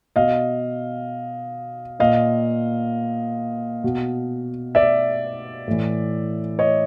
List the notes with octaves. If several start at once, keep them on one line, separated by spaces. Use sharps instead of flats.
B2 D#5 F5
A#2 D#5 F5
B2
D5 E5
A2 E3
C#5 D#5